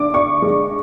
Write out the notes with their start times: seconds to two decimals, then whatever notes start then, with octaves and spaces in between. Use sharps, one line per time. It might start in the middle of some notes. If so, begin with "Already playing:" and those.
Already playing: D3 D4 D6
0.14 D4 C#6
0.42 G#3